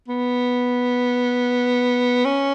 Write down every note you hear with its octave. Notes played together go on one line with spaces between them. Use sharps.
B3
C#4